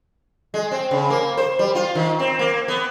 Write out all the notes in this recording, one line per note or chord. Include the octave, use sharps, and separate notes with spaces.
G#3
C4
C#3
A#3
C5
G3
F4
D#3
C4
A#3
B3